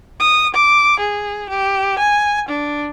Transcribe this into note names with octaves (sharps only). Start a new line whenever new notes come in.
D#6
D6
G#4
G4
G#5
D4